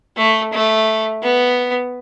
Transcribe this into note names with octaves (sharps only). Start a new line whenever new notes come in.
A3
A3
B3